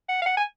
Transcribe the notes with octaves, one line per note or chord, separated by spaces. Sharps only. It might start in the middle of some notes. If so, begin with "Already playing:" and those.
F#5
F5
F#5
G#5